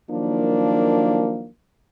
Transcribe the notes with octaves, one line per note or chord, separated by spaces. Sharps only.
D#3 F3 F#3 A#3 D4